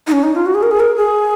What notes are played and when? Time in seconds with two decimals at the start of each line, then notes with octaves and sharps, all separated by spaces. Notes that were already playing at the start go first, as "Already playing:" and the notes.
0.07 D#4
0.12 C#4
0.23 D#4
0.35 F4
0.46 F#4
0.55 G#4
0.63 A#4
0.71 G#4
0.80 A#4
0.96 G#4